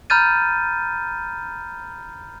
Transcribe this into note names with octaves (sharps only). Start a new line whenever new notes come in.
A#5 B5 F6 G6 A6 D#7